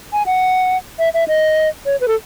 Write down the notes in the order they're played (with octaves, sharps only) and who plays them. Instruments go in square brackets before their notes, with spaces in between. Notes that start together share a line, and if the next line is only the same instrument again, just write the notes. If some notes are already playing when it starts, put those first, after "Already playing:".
[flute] G#5
F#5
E5
E5
D#5
C#5
B4
A4